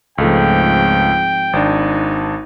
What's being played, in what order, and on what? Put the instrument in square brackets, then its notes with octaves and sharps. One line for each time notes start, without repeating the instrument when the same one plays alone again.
[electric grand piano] C#2 A3 [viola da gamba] G#2 F3 C4 [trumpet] G5
[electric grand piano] G#1 D4 [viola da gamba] D#4